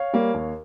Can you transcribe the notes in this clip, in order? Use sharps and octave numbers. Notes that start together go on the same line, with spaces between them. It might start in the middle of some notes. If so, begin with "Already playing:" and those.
Already playing: C#5 F5
G3 A#3
D#2